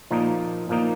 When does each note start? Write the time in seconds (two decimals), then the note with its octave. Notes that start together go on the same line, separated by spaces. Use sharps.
0.11 A#2 F3 A#3 D#4
0.69 A#2 F3 A#3 D#4